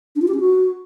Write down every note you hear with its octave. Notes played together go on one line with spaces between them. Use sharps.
D4
F4
G4
C#4
F#4